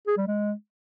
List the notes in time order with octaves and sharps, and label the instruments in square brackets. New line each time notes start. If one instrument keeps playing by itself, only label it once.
[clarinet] G#4
G3
G#3